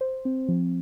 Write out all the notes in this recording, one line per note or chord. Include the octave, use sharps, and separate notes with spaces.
C5
C4
F3